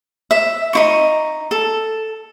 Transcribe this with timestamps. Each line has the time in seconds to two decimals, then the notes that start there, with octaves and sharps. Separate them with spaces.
0.31 E5
0.73 D#4 E4 C#6
1.51 A4